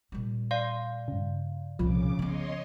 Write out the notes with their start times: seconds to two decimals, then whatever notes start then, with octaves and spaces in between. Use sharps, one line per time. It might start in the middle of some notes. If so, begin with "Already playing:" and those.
0.12 A#2 G3
0.51 D5 F5 C6
1.08 G2 C#3
1.79 C2 A#2 C#3 F3 D6
2.19 B3 C#4 C#5 D#5 C6